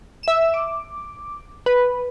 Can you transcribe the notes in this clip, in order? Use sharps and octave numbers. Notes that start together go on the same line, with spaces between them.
E5 E7
D6
B4